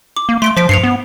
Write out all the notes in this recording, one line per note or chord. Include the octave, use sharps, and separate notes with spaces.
D6
A#3
A3 C6 D7 G7
F3 C5 B6 D7
G2 C7 C#7 F7
B3